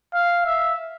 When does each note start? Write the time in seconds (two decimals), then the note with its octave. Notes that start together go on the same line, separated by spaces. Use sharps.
0.14 F5
0.46 E5